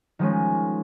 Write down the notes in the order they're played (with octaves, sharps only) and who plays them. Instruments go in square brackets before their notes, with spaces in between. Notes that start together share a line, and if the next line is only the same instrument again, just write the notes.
[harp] D#3 F3 G#3 C#4